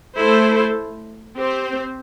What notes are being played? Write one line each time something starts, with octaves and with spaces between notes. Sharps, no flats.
A3 E4 A4 C5
C4 G4 C5